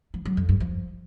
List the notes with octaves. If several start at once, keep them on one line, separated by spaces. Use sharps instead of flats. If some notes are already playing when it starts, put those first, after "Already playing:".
F3
F#3
F2
G2
F3